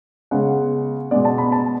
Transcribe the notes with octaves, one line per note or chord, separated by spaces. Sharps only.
C#3 G#3 B3 F#5
B2 G#3 B3 D5
A5
B5
A5